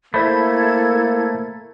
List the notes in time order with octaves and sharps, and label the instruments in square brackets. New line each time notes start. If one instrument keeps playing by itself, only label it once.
[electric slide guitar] A3 C5 E5 [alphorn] A#3 [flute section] E4 A4 G#6 [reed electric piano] B5